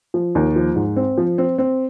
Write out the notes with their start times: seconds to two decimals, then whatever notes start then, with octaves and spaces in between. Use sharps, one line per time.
0.14 F3
0.35 D#2
0.56 F3
0.76 G#2
0.96 C4
1.18 F3
1.38 C4
1.58 C4